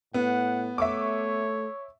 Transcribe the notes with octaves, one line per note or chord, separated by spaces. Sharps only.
A2 B3 F#5
A3 C#5 E5 C#6 D6